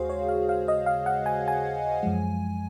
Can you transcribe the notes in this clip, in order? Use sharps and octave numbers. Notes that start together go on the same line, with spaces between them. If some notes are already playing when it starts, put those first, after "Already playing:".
Already playing: D#2 C#3 G#3 F#4 G#4 C5 F5
C#5
F5
F5
D#5
F5
F#5
G#5
G#5
F#2 F3 G#3